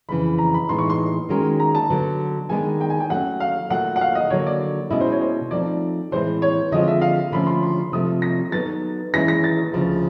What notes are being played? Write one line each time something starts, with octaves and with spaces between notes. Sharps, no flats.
F2 C#3 E3 B5
A#5
B5
A2 E3 G#3 B3 D#4 C6
C#6
C6
D#3 G#3 C#4 F#4 A#4
A#5
A5
D3 F#3 B3
D#3 G#3 B3 D4 G#5
G5
G#5
G5
F#3 A3 C#4 F#5
F5
A#2 F#3 A3 F#5
F#5
F5
D#5
D3 F#3 A#3 C#5
D5
B2 G#3 C#4 E4 D#5
C5
C#5
C5
F3 A3 C4 D#4 D5
A2 E3 G#3 C4 E4 C5
C#5
D3 F3 G#3 C4 F4 D#5
E5
F5
D3 F3 A3 C#4 B5
C6
C6
C3 F3 A3 C4 D#6
A#6
F#3 B3 D#4 F#4 A4 A6
E3 G#3 C#4 E4 A#6
A#6
A6
D2 C#3 F3